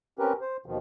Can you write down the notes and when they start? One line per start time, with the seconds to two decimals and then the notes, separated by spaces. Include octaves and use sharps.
0.19 C4 C#4 G4 A#4 B4
0.41 C5
0.66 D#2 B2 D#3 F3